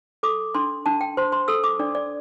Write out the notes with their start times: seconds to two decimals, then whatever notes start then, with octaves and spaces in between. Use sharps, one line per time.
0.23 A4 D6
0.55 D4 C6
0.86 D4 A5
1.01 G5
1.17 C5 C6
1.32 C6
1.48 A4 E6
1.64 D6
1.79 D4 D5
1.95 D5